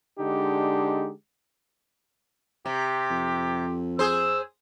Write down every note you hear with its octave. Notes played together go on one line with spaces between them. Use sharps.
D3 G#3 D4 D#4 G4
C3 G4
F2
G#4 C5 E6